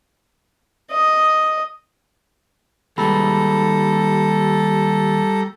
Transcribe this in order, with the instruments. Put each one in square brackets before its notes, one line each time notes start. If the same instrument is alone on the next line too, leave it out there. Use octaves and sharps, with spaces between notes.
[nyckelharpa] D#5
[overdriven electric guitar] D#2 G#3 [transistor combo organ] G3 A#5 [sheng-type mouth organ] A4 [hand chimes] B5